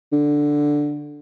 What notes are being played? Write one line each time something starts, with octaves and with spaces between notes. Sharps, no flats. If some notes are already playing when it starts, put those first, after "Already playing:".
D3